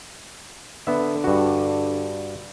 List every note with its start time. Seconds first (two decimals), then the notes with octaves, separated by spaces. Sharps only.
0.87 D3 B3 E5
1.24 G2 F#4